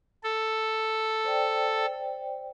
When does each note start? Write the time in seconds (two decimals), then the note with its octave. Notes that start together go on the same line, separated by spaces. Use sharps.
0.24 A4
1.24 C5 D5 G5